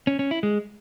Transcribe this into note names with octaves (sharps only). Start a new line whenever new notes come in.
C#4
C#4
E4
G#3